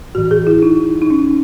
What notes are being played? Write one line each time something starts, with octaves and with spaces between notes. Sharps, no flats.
A2 E3 F#4
G#4
E4
D#4
D#4
C#4